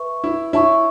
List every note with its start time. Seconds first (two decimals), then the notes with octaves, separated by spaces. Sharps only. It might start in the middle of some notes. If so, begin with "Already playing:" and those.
Already playing: B4 E5 C#6
0.24 E4
0.53 E4 C#5 E5 A5 C#6